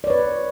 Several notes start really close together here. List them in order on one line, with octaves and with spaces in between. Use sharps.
D5 C#5 B4